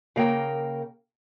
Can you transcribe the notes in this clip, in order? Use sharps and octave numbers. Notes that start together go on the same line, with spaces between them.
C#3 A#3 A#4 G5